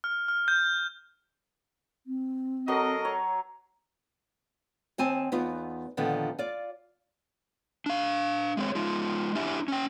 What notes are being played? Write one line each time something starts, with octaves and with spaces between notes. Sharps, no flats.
F6
F6
G6
C4
F#3 A4 A#4 D#5
C#5
D#2 C4 G#5 A5
E2 B3 D#4 F4
A#2 D3 D#3 F3 B3
F4 D5
D4 F5
G#3 C4 C#5
G#3 D#4 F4
D4 E4 G4 E5 G#5
C#4 G5